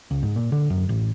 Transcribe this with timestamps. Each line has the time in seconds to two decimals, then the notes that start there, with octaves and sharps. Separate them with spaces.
0.11 C#2
0.23 G#2
0.36 A#2
0.52 D3
0.70 F#2
0.89 A1